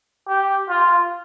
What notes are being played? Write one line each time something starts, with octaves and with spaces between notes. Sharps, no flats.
G4
F4